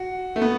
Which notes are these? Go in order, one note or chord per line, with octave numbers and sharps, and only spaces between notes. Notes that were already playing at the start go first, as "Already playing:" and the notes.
Already playing: F#4
A3
B3